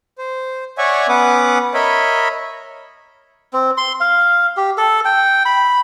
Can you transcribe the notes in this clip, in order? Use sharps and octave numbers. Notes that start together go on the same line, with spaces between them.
C5
C#5 D5 E5 F#5 G#5 C#6
B3 C#4 B4 F#5 D6 D#6
A#4 C#5 D#5 E5 B5
C4
C6
F5
G4
A4
G5
B5